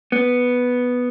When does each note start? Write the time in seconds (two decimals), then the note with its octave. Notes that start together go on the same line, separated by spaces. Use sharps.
0.12 B3